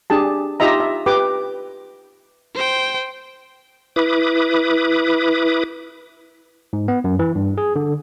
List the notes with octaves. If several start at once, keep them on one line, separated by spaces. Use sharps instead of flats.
D4 G4 G#4 A5
D#4 F4 G4 D#5 E5 A#5
E5
G4 B4 G5 D6
C5 G5
E4 B4 D6 D#6
G#2
B3
F#2
E3
G2
G#4
D3